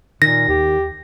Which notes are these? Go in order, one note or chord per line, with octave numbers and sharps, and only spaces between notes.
A#2 D#3 A#6
D#2 G4